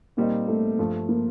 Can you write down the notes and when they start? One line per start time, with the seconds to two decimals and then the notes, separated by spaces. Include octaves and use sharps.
0.17 A#2 G3 A#3 C4 D#4
0.48 A3
0.78 G2 F3 A3
1.09 A#3